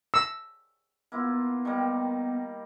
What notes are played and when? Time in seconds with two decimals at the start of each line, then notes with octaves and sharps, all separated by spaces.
0.14 E6
1.12 A#3 B3 E4 F4
1.65 D#3 G3 A#3